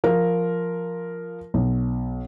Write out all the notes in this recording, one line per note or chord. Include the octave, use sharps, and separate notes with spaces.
F3 F4 A#4
B1